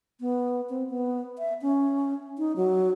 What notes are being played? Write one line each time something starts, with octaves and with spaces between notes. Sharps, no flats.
B3
C4
B3
E5
C#4
D#4
F#3